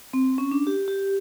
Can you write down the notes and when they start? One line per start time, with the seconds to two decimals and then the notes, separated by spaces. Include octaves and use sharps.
0.13 C4
0.38 C#4
0.51 D4
0.67 G4
0.88 G4